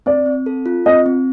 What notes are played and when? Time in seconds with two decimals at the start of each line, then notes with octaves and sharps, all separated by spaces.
0.06 C4 D5
0.26 C4
0.46 A4
0.66 F4
0.86 C4 D#5
1.06 C4